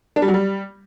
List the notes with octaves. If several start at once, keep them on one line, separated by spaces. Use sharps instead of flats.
D4
G3
F#3
G3